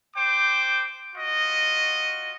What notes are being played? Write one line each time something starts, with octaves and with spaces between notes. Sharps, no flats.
C5 G5 D6
F4 F#4 D#5